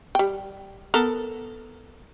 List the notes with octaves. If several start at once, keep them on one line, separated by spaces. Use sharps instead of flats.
G3 G5
B3 A4 A#4